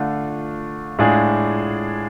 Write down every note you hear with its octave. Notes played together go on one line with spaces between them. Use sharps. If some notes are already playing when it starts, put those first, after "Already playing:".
Already playing: D3 A3 D4 F4
A2 G#3 D4 F4 G#4